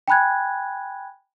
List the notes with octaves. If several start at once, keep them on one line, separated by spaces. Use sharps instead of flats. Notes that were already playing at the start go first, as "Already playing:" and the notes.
G5 G#5 B5 F#6 G#6